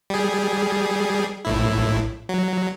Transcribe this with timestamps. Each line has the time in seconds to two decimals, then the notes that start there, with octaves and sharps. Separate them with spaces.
0.10 G3 G#4
1.45 A#1 A2 E4
2.29 F#3